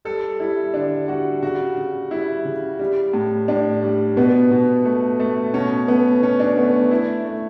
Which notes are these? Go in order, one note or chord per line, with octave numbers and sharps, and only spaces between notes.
G3 A4
G3 E4
D3 D4
G3 F#4
C#3 F#4
C#3
G3 E4
C#3
G3
A2
A2 D4
G3
B2 B3
B2
A3
A3
B2 C#4
A3 B3
B2 C#4
D4
A3 B3
A3 E4
A3